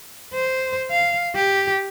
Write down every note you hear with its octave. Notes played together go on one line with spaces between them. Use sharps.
C5
F5
G4